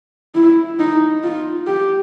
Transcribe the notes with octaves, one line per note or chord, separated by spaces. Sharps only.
E4
D#4
F4
G4